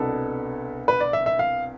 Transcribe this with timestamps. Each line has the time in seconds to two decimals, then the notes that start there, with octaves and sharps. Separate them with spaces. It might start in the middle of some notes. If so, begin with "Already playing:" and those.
Already playing: C2 B2 B3 D4 A4
0.88 B4
1.01 D5
1.13 E5
1.26 E5
1.39 F5